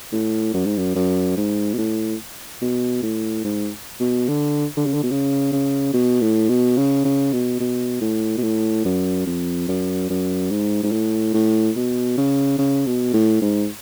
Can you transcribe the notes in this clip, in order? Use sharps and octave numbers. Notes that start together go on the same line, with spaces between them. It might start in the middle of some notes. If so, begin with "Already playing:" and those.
A2
F#2
G#2
F#2
F#2
G#2
B2
A2
B2
A2
G#2
B2
D3
D3
C#3
D3
B2
C#3
C#3
B2
A2
B2
C#3
C#3
B2
B2
A2
B2
A2
F#2
F2
F#2
F#2
G#2
G#2
A2
A2
B2
C#3
C#3
B2
A2
G#2